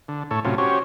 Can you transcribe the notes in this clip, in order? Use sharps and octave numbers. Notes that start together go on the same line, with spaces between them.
D3
A2 A4 C#5
A2 C3 F#3 C#4 F4
C#4 F#4 G4 C5 C#5